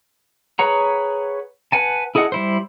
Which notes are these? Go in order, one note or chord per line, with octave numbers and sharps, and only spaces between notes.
G#4 B4 C#5 F#5 A#5
B4 F#5 G#5 A5
E4 G#4 A4 D#5 F#5
G3 E4 C5